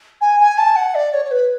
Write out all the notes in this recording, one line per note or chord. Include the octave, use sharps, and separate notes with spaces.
G#5
G#5
A5
F#5
D5
C#5
C#5
B4